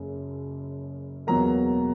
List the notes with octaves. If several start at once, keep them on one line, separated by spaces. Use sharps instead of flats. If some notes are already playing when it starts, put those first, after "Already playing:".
Already playing: F#1 F#2 C#3
E1 E2 B2 F#3 A#3 A#5